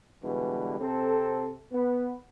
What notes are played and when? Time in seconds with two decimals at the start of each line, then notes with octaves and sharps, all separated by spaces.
0.24 B2 D3 E3 G3 G#3
0.79 C3 C4 A4
1.72 B3